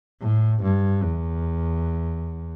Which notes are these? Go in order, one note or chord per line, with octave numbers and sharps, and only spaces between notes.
A2
G2
E2